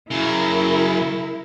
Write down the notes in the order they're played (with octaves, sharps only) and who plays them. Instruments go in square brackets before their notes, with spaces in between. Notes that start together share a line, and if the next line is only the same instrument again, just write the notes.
[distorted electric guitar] C#3 F#3 [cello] E4 A#4